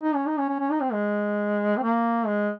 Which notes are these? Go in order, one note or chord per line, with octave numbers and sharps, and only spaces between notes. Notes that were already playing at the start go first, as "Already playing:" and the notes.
D#4
C#4
D#4
C#4
C#4
C#4
D#4
C4
G#3
C4
A#3
G#3